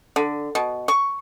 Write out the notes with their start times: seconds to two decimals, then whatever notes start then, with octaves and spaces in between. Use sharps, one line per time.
0.16 D3
0.55 B2
0.88 C#6